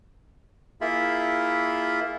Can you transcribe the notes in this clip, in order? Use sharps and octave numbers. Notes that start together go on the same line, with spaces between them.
A#3 E4 F4 G#4 E5 B5